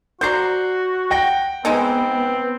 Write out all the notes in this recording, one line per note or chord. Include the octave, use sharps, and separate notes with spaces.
F#4 C5 D5 A#5 G6 C7
F#5 G5 A#6
E3 G#3 B3 C4 D#4